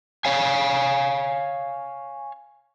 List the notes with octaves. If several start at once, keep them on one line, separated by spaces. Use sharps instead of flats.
C#5 F5 G#5